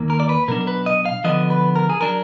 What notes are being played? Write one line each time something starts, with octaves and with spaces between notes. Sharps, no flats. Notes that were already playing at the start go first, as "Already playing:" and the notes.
Already playing: D#2 D#3 A#3
A#4
D5
B4
B2 F#3 D4 A#4
A#4
B4
D#5
F5
D3 F3 B3 D4 D#5
B4
A#4
G#4
F#3 D4 A#4